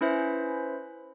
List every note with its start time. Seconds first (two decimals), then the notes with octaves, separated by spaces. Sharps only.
0.01 C#4 E4 B4 C5 E5